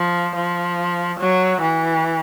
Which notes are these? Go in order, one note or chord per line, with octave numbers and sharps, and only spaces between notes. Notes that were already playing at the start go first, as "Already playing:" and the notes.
Already playing: F3
F3
F#3
E3